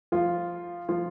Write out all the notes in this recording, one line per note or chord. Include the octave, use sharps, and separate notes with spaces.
F3 F4
F3 F4